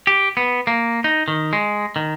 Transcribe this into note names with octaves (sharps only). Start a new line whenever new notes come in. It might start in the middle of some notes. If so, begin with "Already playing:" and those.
G4
B3
A#3
D#4
D#3
G#3
D#3